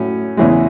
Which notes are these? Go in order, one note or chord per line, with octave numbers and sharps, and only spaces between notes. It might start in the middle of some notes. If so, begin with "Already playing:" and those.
Already playing: A2 F#3 C#4
E2 C#3 E3 G#3